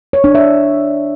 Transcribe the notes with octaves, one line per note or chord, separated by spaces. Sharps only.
C#5
D4
E5